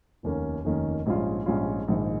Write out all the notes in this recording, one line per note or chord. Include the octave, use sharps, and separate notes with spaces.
F1 D#2 D#3 A#3 C#4
F1 D#2 D#3 A#3 C#4
A#1 G#2 G3 C#4 F4
A#1 G#2 G3 C#4 F4
A#1 G#2 D#3